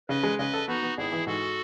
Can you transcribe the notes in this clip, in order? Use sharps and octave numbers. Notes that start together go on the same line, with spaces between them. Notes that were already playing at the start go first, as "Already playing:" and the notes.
C#3 B4 D#5
G#3
C#3 B4 D#5
A4
B3 D#4 F#4
B3
G#1 E4 G#4
E3
G#2 F#4 A4